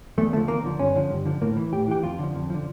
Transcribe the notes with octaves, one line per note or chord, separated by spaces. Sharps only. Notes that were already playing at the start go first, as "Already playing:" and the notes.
E2 A3
D3 F3 A3
E2 A#3
D3 F3
G2 C#4
D3 F3
G2
D3 F3
A2 A#3
E3
A2 G4
E3 G4
F2 F4
D3 F3
F2
D3 F3